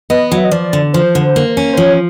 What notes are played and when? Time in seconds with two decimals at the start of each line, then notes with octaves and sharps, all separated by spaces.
0.10 B3 D#5
0.32 F#3
0.38 E5
0.44 D#5
0.52 F3 D5
0.73 D3
0.93 F3 C5
1.15 D3
1.36 A#3
1.57 C#4
1.73 C5
1.77 F3 C#5